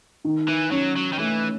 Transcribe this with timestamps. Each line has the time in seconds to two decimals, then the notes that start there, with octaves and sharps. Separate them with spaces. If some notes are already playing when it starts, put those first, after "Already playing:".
0.25 D#3
0.49 E3
0.72 F#3 C#4
0.96 F#3
1.13 D#3
1.19 E3 A3